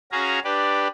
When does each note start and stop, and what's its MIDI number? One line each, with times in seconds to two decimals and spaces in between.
0.12 0.39 61
0.12 0.39 66
0.12 0.39 68
0.12 0.39 77
0.12 0.39 82
0.44 0.88 62
0.44 0.88 67
0.44 0.88 71
0.44 0.88 74